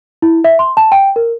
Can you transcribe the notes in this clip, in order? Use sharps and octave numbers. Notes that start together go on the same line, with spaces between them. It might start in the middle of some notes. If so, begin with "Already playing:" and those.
E4
E5
C6
A5
G5
A#4